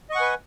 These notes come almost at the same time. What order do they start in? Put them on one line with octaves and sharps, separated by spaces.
D#5 C#6 F#5 G#5 B4